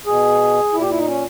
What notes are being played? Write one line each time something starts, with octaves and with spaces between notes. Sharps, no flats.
B2 G#4
A#2 E4
G4
E4
D#4
C#4